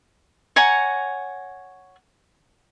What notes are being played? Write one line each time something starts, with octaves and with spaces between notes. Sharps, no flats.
C#5 F#5 G#5 A#5